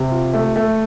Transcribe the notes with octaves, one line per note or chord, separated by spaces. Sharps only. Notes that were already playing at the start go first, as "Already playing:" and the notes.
Already playing: C3
F4
A3
A3